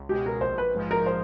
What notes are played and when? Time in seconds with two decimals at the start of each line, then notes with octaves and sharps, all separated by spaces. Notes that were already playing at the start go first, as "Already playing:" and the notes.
Already playing: C#2
0.09 B2 G#3 G4
0.26 A#4
0.41 A#1 C5
0.58 B4
0.74 G#2 F3 G#3
0.91 A#4
1.06 C5